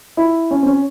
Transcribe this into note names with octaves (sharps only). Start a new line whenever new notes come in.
E4
C#4
C4
C#4